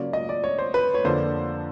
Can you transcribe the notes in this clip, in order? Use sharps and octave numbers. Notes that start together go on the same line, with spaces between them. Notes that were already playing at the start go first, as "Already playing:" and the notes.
Already playing: C#3 F#3 A#3 C#4 F4 D5
D#5
D5
C#5
C5
B4
C#5
F2 D3 F3 A#3 D4 C5